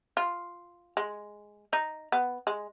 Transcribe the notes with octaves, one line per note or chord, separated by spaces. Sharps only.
F4
G#3
D#4
B3
G#3